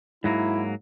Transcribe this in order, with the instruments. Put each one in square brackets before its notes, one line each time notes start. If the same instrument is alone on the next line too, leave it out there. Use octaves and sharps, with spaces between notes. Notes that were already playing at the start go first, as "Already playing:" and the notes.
[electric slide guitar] G#2 F#3 A#3 [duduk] E4